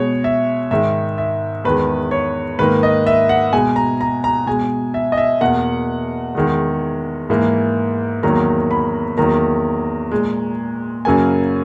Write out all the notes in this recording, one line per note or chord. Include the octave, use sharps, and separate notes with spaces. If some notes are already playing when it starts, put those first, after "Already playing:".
Already playing: B2 G#3 C#5
E5
G#2 D#3 G#3 E5
E5
E2 D#3 G#3 B4
C#5
G#2 D#3 A#3 B4
D#5
E5
F#5
B2 G#3 G#5
A#5
A#5
A#5
B2 G#3 G#5
E5
D#5
E5
E2 B2 A#3 F#5
E2 D#3 G#3
G#2 E3 A#3
E2 D#3 F#3 A#3 A#5
B5
E2 D#3 F#3 A#3 A#5
A#2 G#3
F#2 C#3 F#3 A#3 G#5